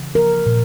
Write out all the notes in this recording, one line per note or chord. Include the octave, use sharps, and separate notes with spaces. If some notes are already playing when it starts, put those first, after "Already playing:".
Already playing: C#3 E3
F3 A#4
A#2